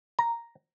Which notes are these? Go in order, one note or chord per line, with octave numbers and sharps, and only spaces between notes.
A#5